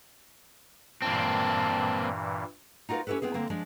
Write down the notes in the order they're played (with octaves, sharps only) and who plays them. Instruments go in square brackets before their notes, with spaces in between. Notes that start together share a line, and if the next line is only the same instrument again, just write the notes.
[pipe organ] G2 A#2 E3 [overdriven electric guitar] A#3 C4 [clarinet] A5
[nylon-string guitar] D#4 F4 F#4 A#4 B4 F5
C#4 E4 G4 A4 B4
B3 C4 E4 G#4
D3 A#3 C4
F3 G#3 D4